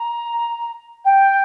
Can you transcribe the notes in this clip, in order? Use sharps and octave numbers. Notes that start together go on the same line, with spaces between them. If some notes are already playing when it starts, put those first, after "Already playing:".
Already playing: A#5
G5